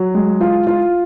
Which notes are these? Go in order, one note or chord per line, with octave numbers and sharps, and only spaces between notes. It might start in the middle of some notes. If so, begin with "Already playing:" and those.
Already playing: F#3
G#3
F4
F4